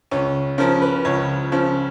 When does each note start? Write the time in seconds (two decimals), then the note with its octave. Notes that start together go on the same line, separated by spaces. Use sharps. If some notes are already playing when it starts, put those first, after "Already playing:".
0.11 C#2 C#4
0.58 C#3 F3 A#4
0.82 B4
1.05 C#2 C#5
1.52 C#3 F3